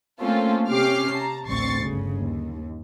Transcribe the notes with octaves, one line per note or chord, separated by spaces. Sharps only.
A3 A#3 C4 C#4 F4 A4
C3 C#4 G4 D6 F6 C7
A5 A#5
A1 D2 C4 C#6 A6 C7
G1 C#3
D#2